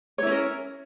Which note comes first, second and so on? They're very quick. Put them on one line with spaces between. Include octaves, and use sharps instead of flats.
C#5 E4 C#4 A#4